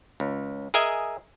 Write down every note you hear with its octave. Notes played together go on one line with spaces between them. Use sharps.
C#2
G#4 A#4 D#5 E5 G#5